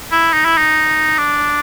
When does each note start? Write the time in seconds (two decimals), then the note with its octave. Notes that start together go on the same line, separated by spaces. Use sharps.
0.12 E4
0.33 D#4
0.45 E4
0.58 D#4
1.18 D4